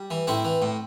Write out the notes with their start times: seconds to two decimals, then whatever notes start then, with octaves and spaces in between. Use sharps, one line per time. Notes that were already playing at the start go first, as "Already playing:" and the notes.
Already playing: G3
0.10 E3
0.27 A2 C4 E4
0.45 E3
0.62 A2